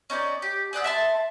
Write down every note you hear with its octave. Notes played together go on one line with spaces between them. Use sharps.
C#4 D#4 C5 D5
G4
G#4 D5 F#5 E6
E5 A5 C6